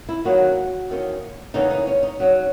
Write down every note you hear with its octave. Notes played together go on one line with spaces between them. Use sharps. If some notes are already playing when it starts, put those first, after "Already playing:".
E4
D#2 D#3 F#3 A#3 C#4 F#4
E2 D#3 A#3 C#4
E2 C#3 E3 A#3 D#4
D#4
C#4
D#4
C#3 F#3 C#4